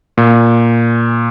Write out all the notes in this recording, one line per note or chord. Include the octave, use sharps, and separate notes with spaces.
A#2